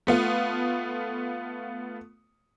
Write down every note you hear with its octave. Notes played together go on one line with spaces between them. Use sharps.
A3 B3 F4